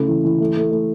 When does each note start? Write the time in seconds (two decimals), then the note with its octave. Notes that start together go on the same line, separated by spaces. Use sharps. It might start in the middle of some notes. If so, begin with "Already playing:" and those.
Already playing: C#3 A3 E4
0.08 E3
0.25 E3
0.40 A3
0.57 A3
0.72 A3